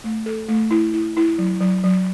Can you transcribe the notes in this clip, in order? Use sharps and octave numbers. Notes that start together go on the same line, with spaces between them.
A3
A4
A3
E4
E4
E4
F#3
F#3
F#3